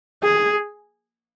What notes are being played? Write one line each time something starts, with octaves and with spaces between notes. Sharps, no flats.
G#4